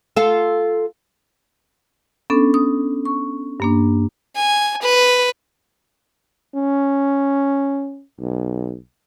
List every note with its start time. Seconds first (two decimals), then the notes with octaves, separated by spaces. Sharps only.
0.17 F4 A4
2.30 B3 C#4 D4 A4
2.54 D#6
3.05 C#6
3.60 G2 A#3 D4
4.36 G#5
4.82 B4
6.55 C#4
8.20 B1